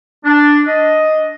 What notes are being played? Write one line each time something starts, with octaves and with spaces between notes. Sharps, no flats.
D4
D#5